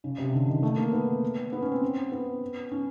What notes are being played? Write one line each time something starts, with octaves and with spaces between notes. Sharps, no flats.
C#3
C3
D3
D#3
A3
A#3
B3
B3
C#4
C4
B3
C#4